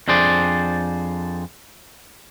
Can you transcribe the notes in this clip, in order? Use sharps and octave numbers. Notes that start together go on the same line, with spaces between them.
F2 D4 G#4 C5 D5